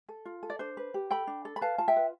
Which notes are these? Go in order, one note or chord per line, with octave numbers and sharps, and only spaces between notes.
A4
F4
A4
D5
D4 C5
B4
G4
A4 G5 B5
D4
A4
B5
B4 F5 A5
F4 A5
E5 G5
B4